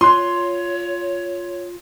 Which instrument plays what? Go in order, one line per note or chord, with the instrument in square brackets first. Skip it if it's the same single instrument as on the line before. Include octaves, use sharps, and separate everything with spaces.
[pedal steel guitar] F4 F#6 [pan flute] C#5 [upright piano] C6